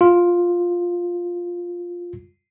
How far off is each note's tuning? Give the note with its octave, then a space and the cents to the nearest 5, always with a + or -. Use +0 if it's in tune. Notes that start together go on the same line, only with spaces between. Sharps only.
F4 +5